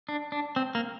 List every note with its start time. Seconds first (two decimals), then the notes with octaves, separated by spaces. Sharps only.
0.09 D4
0.32 D4
0.56 C4
0.75 A#3